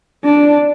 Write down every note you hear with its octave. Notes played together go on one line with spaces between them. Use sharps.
D4